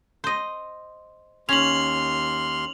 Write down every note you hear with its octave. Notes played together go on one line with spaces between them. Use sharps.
C5 D#5
D#2 C#4 C6 F6 F7 F#7